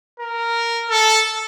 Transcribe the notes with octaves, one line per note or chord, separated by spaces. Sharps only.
A#4
A4